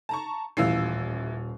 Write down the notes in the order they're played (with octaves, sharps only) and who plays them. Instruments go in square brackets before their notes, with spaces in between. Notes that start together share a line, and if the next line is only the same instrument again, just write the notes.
[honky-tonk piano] A5 A#5 C#6
[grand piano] D#1 F5 C7 [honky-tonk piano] A1 E3 E6